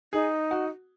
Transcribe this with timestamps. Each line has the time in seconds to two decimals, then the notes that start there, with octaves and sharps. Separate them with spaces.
0.13 D#4 G#4
0.51 F#4